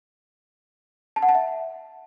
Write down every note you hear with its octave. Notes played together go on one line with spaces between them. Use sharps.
A5
F#5
A5
E5